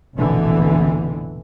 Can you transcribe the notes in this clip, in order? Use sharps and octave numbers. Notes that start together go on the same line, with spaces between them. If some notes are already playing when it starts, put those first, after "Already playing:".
F1 A#1 B2 D3 E3